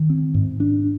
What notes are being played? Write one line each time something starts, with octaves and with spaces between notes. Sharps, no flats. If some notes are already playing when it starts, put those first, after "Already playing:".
Already playing: D#3
C4
G#2
D4